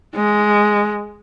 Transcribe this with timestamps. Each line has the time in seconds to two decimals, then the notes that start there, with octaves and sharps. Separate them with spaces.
0.15 G#3